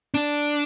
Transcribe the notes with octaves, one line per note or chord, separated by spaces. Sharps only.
D4